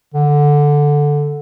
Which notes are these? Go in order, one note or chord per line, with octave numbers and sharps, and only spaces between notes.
D3